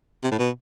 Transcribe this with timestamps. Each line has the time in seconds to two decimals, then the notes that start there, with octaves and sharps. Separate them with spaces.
0.24 C3
0.31 A2
0.39 B2